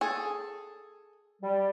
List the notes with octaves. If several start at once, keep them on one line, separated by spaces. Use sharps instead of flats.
G#4 A4
G3